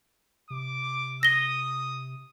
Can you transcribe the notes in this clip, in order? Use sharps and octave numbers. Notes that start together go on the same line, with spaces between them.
C3 D6
D#6 A#6 G7